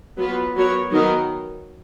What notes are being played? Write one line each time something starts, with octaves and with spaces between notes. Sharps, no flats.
F#3 B3 F4 B4
F#3 B3 F#4 A#4 C#5
D#3 F#3 B3 D#4 A#4